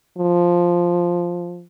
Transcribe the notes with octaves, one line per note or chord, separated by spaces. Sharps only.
F3